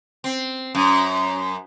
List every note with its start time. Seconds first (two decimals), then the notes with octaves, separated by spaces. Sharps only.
0.24 C4
0.75 F#2